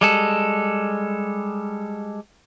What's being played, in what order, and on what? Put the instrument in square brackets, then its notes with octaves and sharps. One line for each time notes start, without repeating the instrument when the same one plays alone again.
[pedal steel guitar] G3 G#3 A4